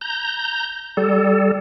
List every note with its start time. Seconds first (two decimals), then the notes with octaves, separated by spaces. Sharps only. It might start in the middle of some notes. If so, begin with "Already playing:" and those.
0.01 A#5 G6
0.97 G3 A4